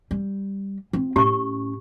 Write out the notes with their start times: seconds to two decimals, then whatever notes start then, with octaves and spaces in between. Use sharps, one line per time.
0.11 G3
0.93 C4 F4
1.16 A2 C#4 G4 C#6